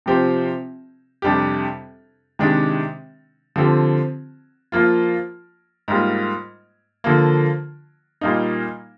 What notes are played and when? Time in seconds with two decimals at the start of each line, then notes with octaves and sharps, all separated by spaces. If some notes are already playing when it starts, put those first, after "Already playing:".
0.06 C3 F3 C4 G4
1.22 F2 C3 G3 D4 G4
2.39 C3 D#3 G#3 D4 G4
3.56 D3 F3 C4 G4
4.72 F3 A#3 F4
5.88 G#2 G3 A#3 F4
7.04 D3 F3 A#3
8.21 A#2 G3 A#3 D#4